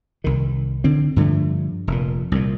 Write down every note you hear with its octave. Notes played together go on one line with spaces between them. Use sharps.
C2 D#3
D3 C4
G2 D3 F3 A3
F1 A#2
C2 A#2